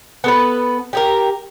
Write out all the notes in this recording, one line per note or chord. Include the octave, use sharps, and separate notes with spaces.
B3 A4 B4
G4 G#4 A#4